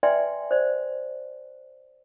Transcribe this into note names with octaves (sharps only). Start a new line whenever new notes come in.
B4 D5 E5 G5 G#5 C6
C5 D5